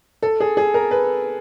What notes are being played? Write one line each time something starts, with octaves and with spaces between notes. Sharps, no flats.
A4
G#4
G#4
A#4
B4